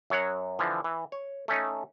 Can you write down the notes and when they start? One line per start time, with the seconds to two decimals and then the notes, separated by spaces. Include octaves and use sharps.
0.10 F#2 F#3 C#5 F#5
0.59 D3 E3 F3
0.84 E3
1.12 C#5
1.48 A3 C#4 D#4